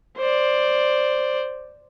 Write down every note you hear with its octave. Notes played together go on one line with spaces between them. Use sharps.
C5 D5